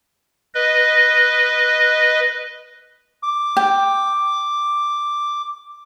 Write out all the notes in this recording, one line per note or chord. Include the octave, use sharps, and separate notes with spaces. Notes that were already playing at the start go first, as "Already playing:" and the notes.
B4 D#5
D6
G5